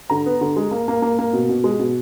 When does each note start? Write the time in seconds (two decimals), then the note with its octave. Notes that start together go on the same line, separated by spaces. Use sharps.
0.10 D3 A#5
0.26 B3
0.41 D3
0.56 G#3
0.71 A#3
0.88 A#3
1.02 A#3
1.19 A#3
1.33 B2
1.49 B2
1.64 G#3
1.79 B2